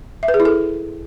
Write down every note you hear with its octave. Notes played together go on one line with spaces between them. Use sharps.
E5
B4
G#4
E4
A4